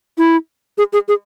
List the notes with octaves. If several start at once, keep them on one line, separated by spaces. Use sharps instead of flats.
E4
G#4
G#4
G#4